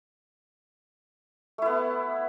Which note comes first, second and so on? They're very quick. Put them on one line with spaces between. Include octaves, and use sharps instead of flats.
A3 E4 B3